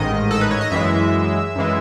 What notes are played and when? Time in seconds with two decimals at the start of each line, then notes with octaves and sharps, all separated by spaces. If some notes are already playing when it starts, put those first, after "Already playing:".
Already playing: A1 G#2 D#3 D#5
0.31 A4
0.41 B4
0.51 C#5
0.61 D#5
0.71 F#2 E3 G#3 E5
1.55 F#2 E3 G#3